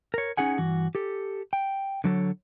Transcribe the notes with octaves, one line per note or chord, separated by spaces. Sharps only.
A#4 C#5
C#4 D#4 G#4 F#5 G#5
G2 E3 F#4
G4 A4
G5
D3 F#3 A4 C#5